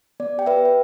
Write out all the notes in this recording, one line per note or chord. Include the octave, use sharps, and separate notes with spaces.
B3 D5
G4 G5
B4 E5
G4
G5